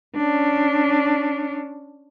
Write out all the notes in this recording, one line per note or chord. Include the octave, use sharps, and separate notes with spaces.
C#4 D4